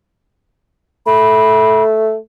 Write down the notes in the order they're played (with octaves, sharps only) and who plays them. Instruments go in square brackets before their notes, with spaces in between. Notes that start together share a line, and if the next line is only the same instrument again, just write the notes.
[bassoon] A3 [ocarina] B5